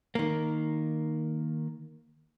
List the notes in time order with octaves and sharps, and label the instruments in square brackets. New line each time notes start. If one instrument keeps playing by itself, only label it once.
[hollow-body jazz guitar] D#3 A#3